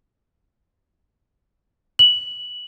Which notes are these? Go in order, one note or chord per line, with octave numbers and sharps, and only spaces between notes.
F#7